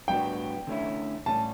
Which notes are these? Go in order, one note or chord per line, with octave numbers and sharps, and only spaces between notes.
A2 G3 B3 D4 F#4 G5
D3 A3 C#4 E4
A2 G3 C#4 A5